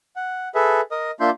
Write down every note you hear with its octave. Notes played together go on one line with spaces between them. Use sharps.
F#5
G#4 A4 B4 E5
A#4 D#5 D#6
A#3 D4 F4 E5 C6 G6